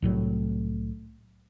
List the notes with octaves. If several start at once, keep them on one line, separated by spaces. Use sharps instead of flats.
C2 A2 F#3